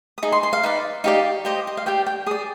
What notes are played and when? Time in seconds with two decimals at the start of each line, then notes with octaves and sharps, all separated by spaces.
0.18 D#6
0.23 D#4 G#4
0.32 C6
0.43 C6
0.53 F5
0.63 D#4 B4 D5
1.04 D#4 G4 D5 F5
1.45 G4 C5 D#5
1.67 D#5
1.77 F5
1.86 G4 D5 G5
2.06 G5
2.26 G#4 D#6
2.31 D5